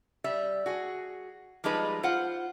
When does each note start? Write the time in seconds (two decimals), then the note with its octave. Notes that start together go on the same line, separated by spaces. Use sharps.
0.24 G3 E5
0.66 F#4 G#4
1.64 F3 G3 G#3 D#4 B4
2.03 F4 C5 F5 F#5